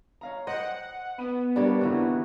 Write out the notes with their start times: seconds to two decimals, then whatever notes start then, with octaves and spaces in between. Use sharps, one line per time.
0.21 C#5 F5 A#5
0.47 C5 D#5 F#5 G5 C6
1.18 B3 B5 D#7
1.56 G3 A#3 D4 C#5 F5
1.81 G#1 D3 E3 F#4